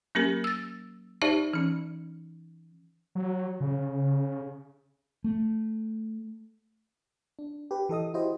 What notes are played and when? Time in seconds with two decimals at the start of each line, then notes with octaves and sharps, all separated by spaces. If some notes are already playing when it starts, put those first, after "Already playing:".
0.15 F#3 A#3 C#4 G4 A#4
0.44 E6 A6
1.22 D#4 G4 C5 D5 E5 A5
1.54 E3 C#4
3.15 F#3
3.60 C#3
5.24 A3
7.39 D4
7.71 G4 B4
7.89 E3 A4 D#5 D#6
8.14 E4 F#4 G4 C5 D#5